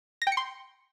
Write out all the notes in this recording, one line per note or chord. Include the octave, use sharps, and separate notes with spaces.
A#6
G5
C#7
C6